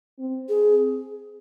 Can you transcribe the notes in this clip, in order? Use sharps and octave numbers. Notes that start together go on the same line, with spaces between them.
C4
G#4